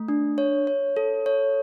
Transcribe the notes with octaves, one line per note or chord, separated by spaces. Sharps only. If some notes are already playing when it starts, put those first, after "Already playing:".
Already playing: A3
D4
C#5
C#5
A4
C#5